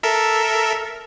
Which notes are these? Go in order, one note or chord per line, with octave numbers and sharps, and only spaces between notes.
A4 A#4 E5